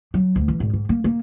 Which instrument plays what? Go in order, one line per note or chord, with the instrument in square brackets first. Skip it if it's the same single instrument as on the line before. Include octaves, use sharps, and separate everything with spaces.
[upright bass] F#3
D2
E3
G#1
G#2
A#3
A#3